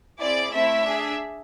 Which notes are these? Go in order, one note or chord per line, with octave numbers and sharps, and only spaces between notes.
C4 E4 G#4 D5
A3 C4 E4 E5
D4 G#4